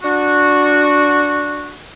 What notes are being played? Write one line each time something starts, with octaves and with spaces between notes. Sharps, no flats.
D4 F#4